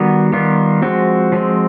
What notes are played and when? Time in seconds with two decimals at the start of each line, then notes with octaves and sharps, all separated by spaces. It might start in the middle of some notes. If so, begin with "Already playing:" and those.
Already playing: D#3 G3 B3 F#4
0.33 D#3 G3 B3 F4
0.82 F3 G#3 C4 F#4
1.32 F3 G#3 C4